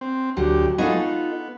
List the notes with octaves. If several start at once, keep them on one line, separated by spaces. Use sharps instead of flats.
C4
D2 F#3 G4
F#3 G#3 B3 D#4 F4 A4
B3